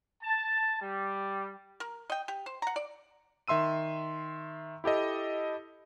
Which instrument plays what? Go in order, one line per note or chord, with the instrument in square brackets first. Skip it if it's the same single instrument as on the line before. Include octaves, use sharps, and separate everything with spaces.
[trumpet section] A5
G3
[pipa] A#4
D#5 G5
G4
C5
F#5 A#5
D5
[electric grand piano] D#3 E5 C6 E6 D#7
E4 G4 A4 D#5